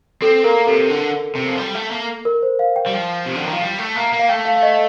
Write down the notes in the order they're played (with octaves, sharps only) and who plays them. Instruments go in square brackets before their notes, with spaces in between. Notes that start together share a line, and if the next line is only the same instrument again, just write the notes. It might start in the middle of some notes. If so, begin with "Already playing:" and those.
[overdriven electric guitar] C4 [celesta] A4
[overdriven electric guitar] A#3 [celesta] A#4
[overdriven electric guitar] C3 [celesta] A4
[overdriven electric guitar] D3
C3
F3
G3
A3
A#3
[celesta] A#4
C5
F5
G5
[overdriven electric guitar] G3
F3
C3
D3
D#3
F3
G3
A3
A#3
A#3
[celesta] F5
[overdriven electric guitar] A3 [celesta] G5
[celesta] F5
F5
D#5